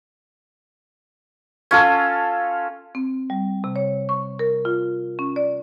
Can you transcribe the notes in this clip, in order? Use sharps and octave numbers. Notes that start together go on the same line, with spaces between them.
C#4 F4 A4
C4
G3
C3
C#5
C#6
A#4
F4
C#4
D5